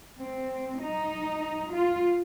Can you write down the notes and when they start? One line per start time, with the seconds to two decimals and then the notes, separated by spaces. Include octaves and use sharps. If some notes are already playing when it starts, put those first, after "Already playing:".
0.18 C4
0.80 D#4
1.71 F4